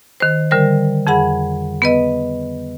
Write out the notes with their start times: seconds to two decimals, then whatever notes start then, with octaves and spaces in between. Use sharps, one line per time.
0.20 D#3 C5
0.51 D3 G3 A#4 C5
1.07 F2 G#4 F#5 B5
1.82 B3 B4 D#5